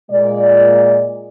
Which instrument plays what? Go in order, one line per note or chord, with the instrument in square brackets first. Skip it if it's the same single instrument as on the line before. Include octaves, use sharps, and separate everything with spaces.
[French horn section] A#2 G#3 D5